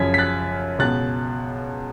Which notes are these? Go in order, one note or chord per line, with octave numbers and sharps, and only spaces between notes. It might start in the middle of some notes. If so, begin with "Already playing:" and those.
Already playing: F#2 C#3 F3 G#6 B6
B6
F#6 A6
C#2 B2 F#6 A6